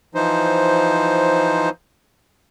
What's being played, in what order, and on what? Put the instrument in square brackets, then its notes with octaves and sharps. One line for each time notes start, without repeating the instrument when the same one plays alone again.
[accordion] E3 F3 D#4 C5